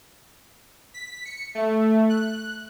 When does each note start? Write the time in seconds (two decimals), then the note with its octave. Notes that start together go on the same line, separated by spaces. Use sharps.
0.94 B6
1.25 C#7
1.55 A3
2.10 F#6